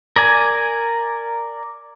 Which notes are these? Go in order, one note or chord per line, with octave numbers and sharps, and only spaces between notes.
A#4 D5 G#5